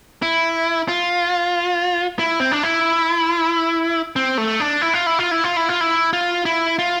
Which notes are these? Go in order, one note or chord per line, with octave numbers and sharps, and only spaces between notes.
E4
F4
E4
C4
D4
E4
C4
A3
D4
E4
F4
E4
F4
E4
F4
E4
F4
E4
F4
E4
F4